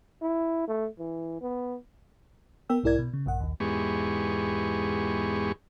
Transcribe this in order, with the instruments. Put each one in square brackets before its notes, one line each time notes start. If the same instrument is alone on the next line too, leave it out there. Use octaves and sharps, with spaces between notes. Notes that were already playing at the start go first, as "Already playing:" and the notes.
[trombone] E4
A3
E3
B3
[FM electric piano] B3 A#4 G5 E6
B1 G#2 E4 A#4 D5 G#6
B2
C#3
A#1 G2 F#5
A#1 D#2
[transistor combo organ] E2 G#2 G#3 B3 G4 C#6